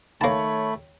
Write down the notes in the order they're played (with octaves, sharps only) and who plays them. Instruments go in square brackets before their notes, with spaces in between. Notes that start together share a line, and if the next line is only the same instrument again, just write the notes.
[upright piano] D#3 C#5 [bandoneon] A3 [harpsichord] A#3 A5 [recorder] B5